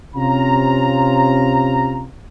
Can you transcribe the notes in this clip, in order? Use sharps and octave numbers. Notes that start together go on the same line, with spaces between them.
C3 C#4 F4 A#5